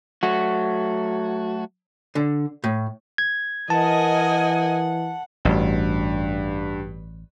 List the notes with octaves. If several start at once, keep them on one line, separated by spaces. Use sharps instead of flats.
F#3 A3 F#4
D3
A2
G#6
E3 A#4 D#5 F#5 G#5 A5
A1 G2 F#4